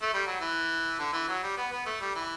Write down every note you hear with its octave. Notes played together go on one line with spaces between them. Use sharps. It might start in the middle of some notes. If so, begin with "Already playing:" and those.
A3
G3
F#3
E3
D3
E3
F#3
G3
B3
B3
A3
G3
E3